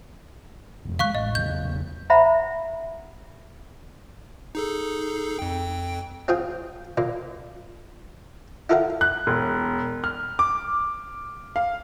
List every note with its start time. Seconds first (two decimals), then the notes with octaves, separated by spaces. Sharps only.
0.85 E1 F2
0.99 D#3 G#3 F5 C#6 F#6
1.15 A1 D#5
1.35 E2 C#3 F#3 G6
2.10 C5 E5 F#5 A#5 B5
4.55 D#4 G#4 A4
5.39 F2 G5
6.28 C4 F4 G#4 G5
6.97 A#2 A#3
8.69 E4 F4 A4 A#4 E5 F#5
9.01 F#6
9.27 E1
10.04 F6
10.39 D6
11.56 F5